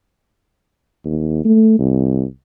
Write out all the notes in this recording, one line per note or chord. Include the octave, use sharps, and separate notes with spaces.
D#2
A3
C2